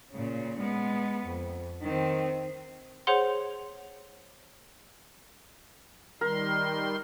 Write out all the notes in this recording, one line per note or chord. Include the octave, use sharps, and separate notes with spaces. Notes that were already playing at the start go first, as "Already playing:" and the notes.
A#2 C#3
G#3 B3
F2
D#3 C4
G#4 C5 C#5 F#5 C6
D#3 G3 A#4 C6